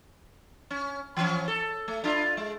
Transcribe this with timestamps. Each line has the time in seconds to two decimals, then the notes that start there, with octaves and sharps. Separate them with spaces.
0.71 C#4
1.17 E3 F3 C#4
1.48 A4
1.88 A3
2.04 D4 E4 F4
2.37 G#3